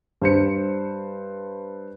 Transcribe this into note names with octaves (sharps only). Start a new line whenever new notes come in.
G2 C5 C#7